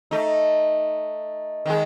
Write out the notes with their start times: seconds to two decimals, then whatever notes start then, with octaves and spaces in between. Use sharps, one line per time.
0.11 A3 D#4
1.66 D#3 G#3